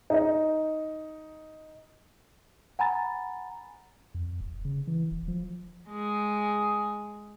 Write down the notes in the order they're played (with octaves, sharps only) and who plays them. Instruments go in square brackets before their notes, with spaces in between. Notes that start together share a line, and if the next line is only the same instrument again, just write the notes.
[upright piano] D#4 D#5
[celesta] F#5 G#5 A#5 B5 A6
[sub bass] F2
E1
C#3
E3
E1
F3
[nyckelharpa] G#3 G#4